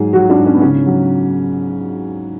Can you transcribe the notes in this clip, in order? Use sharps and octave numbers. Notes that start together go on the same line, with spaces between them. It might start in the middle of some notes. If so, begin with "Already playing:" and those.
Already playing: G#2 F#3 G#4
F#3 F#4
D4
G#2
C#4
B3
C#3 C#4
F#3